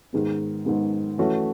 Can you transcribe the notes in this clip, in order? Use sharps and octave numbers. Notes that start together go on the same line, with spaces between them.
G#2 D#3 G#3 B3
G#2 D#3 G#3 B3
E3 A3 C#4 F#4